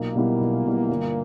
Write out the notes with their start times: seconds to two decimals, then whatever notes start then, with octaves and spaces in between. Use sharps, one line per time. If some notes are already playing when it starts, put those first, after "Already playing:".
Already playing: B1 A#2 A#3
0.15 B2 G3 B3 E4
0.40 B1
0.64 B2 G3 B3 E4
0.89 G1